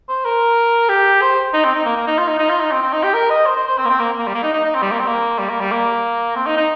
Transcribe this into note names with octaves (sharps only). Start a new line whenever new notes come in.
C5
A#4
G4
C5
D#4
C4
D#4
A#3
A#3
D#4
F4
D#4
D#4
F4
D#4
C4
C4
D#4
G4
A#4
D#5
C5
C5
C5
C4
A#3
C4
A#3
A#3
G3
A#3
D#4
D#4
D#4
C4
G3
A#3
C4
A#3
G3
A#3
G3
A#3
C4
D#4
D#4